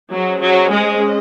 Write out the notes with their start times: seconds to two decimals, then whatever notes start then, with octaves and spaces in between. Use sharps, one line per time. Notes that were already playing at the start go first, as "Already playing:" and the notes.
0.12 F#3 C#4 G#4 C5 D#5
0.42 F#3
0.73 G#3